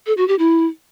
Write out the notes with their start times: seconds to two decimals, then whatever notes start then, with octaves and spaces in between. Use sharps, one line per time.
0.07 A4
0.17 F#4
0.28 G4
0.39 E4